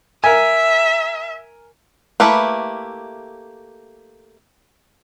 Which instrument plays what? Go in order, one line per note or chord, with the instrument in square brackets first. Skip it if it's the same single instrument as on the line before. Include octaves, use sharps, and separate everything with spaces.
[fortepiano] A#4 G#5 [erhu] E5
[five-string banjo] A3 A#3 E4 G4 B4